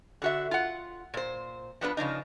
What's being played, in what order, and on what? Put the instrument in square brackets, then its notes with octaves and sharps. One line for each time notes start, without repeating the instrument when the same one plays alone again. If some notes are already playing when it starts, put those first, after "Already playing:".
[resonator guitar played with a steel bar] D3 F#4 E5
F4 F#5
A#2 C5
F3 B3 D4 B4
C#3 F3 D4 D#4